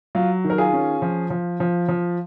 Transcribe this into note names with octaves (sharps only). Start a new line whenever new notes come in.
F#3 F4
D#3
A#4
F4 G#4
C#4
F3
F3
F3
F3